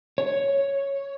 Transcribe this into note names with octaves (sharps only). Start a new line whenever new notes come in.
C#5